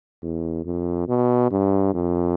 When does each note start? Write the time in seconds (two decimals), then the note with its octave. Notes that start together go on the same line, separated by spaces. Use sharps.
0.23 E2
0.65 F2
1.08 B2
1.51 G2
1.95 F2